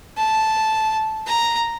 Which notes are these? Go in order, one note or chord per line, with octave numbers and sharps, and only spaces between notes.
A5
A#5